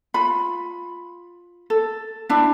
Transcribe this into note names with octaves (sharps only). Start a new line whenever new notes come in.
F4 B5
A4
D4 E4